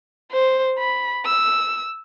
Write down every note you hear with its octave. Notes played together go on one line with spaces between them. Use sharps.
C5
B5
E6